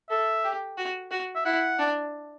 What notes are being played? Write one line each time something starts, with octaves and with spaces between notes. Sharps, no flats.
A4 E5
G4
F#4
F#4
E5
E4 F#5
D4